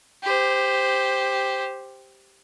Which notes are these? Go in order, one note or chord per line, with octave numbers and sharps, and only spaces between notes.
G4 C5